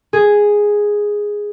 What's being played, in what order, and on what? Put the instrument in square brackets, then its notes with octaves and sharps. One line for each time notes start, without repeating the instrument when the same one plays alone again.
[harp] G#4